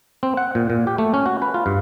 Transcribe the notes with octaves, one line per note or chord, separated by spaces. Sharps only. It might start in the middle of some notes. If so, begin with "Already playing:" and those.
C4
F#5
A#2
A#2
G4
A3
C#4
F#4
B4
F4
G2